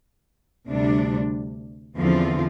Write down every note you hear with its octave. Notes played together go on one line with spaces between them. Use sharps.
D2 C3 G3 D4
E2 D3 F3 C4 F4